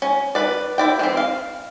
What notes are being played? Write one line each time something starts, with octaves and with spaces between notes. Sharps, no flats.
C#4
B4 D5
E4 D5 G5
E3 C4
F5